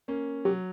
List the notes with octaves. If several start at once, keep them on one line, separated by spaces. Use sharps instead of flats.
A#3 C#4
F#3 G4